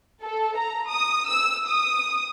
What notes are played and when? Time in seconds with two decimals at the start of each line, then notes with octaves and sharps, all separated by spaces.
0.22 A4
0.57 A#5
0.89 D#6
1.27 E6
1.67 D#6